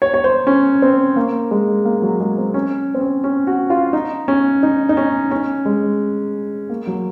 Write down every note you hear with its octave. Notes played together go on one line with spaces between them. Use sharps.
C#5
C#5
C5
C#4
C4
A#3
G#3
A#3
F#3
G#3
C4
C#4
C4
C#4
C#4
F#4
F4
D#4
C#4
D#4
D#4
C#4
C#4
G#3
A#3
F#3